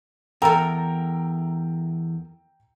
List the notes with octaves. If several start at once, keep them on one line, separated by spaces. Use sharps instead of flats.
E2 A4 A#4 G5 A#5 E6